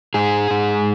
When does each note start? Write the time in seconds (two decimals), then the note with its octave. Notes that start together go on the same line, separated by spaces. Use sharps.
0.14 G#2 G#4
0.51 G#2